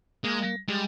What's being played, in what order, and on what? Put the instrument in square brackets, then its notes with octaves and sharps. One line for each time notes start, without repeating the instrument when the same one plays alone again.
[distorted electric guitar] G#3 [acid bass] A#3
[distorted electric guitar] G3 [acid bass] G#3